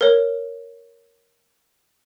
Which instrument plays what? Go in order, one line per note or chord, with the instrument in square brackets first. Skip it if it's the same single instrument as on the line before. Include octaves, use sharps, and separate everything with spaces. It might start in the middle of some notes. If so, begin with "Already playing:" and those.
[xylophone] A#4 C#5